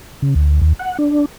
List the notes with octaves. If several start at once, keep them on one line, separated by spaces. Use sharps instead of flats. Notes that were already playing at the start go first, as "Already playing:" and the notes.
C#3
D2
D#2
F#5
D4